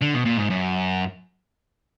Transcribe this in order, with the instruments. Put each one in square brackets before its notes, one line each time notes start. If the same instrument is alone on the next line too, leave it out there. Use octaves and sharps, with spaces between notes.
[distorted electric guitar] D3
B2
A#2
G#2
F#2